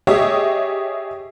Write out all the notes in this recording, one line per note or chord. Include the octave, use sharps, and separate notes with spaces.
G4 G#4 C#5 D#5 E5